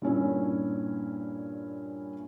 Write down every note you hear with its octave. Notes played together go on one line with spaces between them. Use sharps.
G2 A#2 C#4 E4